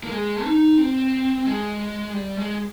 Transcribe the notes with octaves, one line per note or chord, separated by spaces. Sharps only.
A#3
G#3
D#4
C4
G#3
G3
G#3